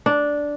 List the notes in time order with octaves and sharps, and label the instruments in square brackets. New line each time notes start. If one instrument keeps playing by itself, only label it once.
[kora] D4